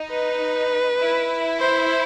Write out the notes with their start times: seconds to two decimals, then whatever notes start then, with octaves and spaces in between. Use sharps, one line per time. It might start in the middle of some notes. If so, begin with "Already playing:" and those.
Already playing: D#4
0.10 B4
1.00 E4
1.60 C5